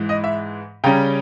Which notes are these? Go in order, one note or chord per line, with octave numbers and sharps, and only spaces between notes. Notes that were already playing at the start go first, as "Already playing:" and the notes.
Already playing: G#2 E3 G#3
D#5
E5
C#3 G3 C#4 G5 A#5